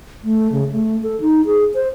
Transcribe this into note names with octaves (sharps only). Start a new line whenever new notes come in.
A3
C#3
A3
A4
D#4
G#4
C5